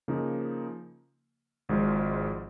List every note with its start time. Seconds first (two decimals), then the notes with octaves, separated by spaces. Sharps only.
0.08 C#3 F3 A#3 D#4
1.69 G#1 G#2 F3